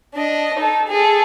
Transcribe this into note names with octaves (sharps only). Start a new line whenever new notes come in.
D4 D#5
D#4 A4
G#4 A4